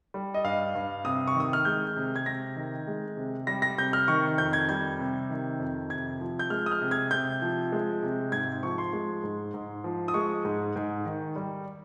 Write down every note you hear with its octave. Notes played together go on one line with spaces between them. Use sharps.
G3
D#5
G2 F5
G2
C3 D#6
C#6
D#3 D#6
F6
G#3 G6
C3
G#6
C3 A#6
D#3
G#3
C3
G3 A#6
A#6
C3 G6
F6
D#3 C#6
F2 G6
G#6
G3 G#6
C3
D#3
F2
C3 G#6
F3
G6
G#3 F6
D#6
F6
C3
G#6
C3 G6
F3
G#3
C3
G#2 G#6
F3 C#6
C6
G#3
G#2
G#2
F3
D#6
G#3 C#6
G#2
G#2
D#3
G3